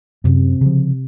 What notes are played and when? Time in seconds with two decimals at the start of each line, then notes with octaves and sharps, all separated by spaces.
0.24 F#2 C3
0.61 C#3 F3